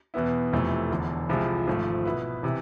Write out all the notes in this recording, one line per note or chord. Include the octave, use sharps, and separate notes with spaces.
E2 B2 B3 E4
F1 F2 C3 E3 A3
E1 E2 D3
C2 C3 F3 G#3
G#1 G#2 F3 A3
B2 B3 E4 B4
C3 E3